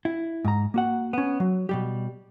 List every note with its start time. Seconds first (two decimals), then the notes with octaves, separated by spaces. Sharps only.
0.05 E4
0.45 G#2 A#5
0.74 A#3 F#4 F#5
1.13 B3 C#4
1.40 F#3
1.69 B2 G3 G4